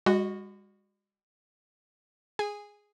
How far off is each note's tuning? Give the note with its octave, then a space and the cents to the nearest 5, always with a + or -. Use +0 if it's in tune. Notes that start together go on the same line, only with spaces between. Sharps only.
G#3 -45 F#4 -5 D#5 +10
G#4 +0 G#5 -15